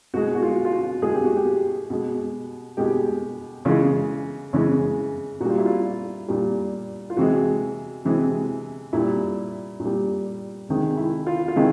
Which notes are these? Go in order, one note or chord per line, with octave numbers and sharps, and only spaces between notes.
B2 G#3 F#4
F#4
F4
F4
F#4
B2 G#3 G#4
G4
F#4
G4
B2 G#3
B2 G#3 G4
C#3 E3 G#3 F4
C#3 E3 G#3
A#2 G3 F#4
F4
E4
F4
A#2 G3
F4
C3 E3 G#3 F#4
C3 E3 G#3
A#2 G3 E4
A#2
G3
C3 D#3 G#3
E4
F4
F4
C3 D#3 G#3 E4